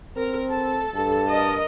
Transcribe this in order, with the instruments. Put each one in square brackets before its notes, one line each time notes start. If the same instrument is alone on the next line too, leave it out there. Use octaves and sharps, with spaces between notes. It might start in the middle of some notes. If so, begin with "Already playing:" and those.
[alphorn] C4 [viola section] A#4
[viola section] A4 [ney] A5
[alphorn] G2 [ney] A5
[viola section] A#4 D#5